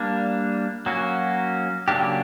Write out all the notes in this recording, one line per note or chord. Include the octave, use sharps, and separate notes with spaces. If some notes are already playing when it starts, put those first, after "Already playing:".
Already playing: G3 A#3 D4
F#3 A#3 C#4 F#4
C#3 F#3 A#3 D4 G4